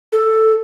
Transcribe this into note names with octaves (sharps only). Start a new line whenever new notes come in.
A4